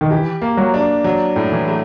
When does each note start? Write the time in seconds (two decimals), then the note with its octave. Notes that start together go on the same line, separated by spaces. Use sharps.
0.01 D#3
0.10 E3 G4
0.42 A#3
0.57 F#3
0.74 D4
1.04 F#3
1.36 A2
1.52 E3
1.68 A3